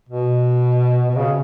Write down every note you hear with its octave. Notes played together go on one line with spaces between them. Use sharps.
B2
B2
C#3